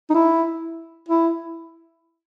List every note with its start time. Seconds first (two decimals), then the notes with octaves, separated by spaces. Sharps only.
0.10 D#4
0.14 E4
1.09 E4